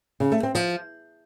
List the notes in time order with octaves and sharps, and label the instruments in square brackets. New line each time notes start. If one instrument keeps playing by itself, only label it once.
[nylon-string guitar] C#3
A3
C4
F3